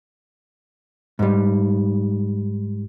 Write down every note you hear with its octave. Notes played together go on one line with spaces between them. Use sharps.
G#2 G3